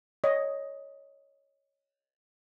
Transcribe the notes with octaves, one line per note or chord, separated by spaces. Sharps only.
C#5 D#5